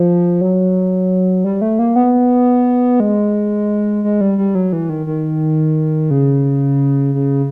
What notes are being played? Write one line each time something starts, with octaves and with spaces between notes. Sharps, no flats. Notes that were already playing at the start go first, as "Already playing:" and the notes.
Already playing: F3
F#3
G3
A3
A#3
B3
G#3
G#3
G3
G3
F#3
E3
D#3
D#3
C#3
C#3